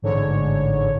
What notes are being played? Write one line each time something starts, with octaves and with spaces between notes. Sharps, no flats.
A1 G#2 D3 C#5